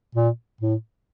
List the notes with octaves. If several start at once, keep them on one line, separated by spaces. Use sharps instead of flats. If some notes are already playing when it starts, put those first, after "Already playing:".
A#2
A2